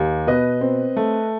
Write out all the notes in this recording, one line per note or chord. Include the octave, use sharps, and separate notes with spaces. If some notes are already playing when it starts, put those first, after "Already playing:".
Already playing: D#2
B2 B4 D#5
C4
A3